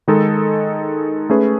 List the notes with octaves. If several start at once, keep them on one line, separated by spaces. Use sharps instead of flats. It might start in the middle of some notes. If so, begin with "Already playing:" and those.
D#3 G#3 D#4 A4
A3 C#4 G#4 B4